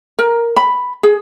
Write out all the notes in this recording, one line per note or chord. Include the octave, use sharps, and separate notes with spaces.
A#4
B5
G#4